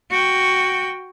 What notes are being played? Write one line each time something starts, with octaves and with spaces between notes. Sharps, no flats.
F#4 G5